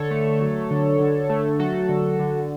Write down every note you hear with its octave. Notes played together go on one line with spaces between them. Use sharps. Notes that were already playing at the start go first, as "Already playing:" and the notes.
Already playing: D3 A4 C#5
A3
F#3
D3
D3
A3
F#3 F#4 A4
D3
D3